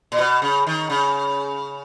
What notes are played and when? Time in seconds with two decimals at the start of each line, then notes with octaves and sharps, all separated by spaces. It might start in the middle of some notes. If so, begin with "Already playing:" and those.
0.12 A#2
0.19 B2
0.42 C#3
0.67 D#3
0.90 C#3